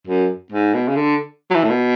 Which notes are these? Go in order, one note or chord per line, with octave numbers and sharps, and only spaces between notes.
F#2
G#2
B2
C#3
D3
F#3
E3
A2
B2